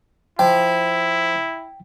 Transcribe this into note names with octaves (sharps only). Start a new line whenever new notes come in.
F3 E4 G5